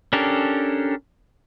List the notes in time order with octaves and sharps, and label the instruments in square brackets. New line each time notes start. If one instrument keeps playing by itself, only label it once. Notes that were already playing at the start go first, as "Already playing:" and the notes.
[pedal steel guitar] C#4 D4 G4 A4 A#4